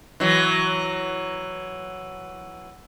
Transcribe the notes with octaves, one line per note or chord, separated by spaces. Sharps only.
E3 F#3